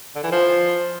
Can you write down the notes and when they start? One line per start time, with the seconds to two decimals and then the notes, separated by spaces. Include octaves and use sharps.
0.16 D3
0.24 E3
0.32 F3